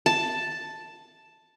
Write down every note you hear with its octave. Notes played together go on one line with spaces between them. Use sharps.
A5